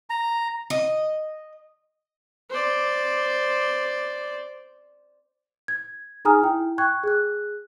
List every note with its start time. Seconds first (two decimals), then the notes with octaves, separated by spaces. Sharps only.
0.10 A#5
0.70 D#5
2.50 C5 D5
5.68 G#6
6.25 D#4 G#4 G#5 A#5 D#6 F6
6.43 E4 G5
6.78 G5 C#6 F#6 G#6
7.04 G#4 F#6